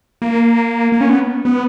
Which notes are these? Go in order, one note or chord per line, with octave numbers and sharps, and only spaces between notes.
A#3
A#3
C#4
B3
B3